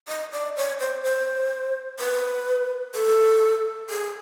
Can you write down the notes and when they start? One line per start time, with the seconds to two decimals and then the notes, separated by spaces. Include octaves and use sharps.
0.08 D#5
0.32 D5
0.57 C#5
0.80 C5
1.04 C5
2.00 B4
2.95 A4
3.90 G#4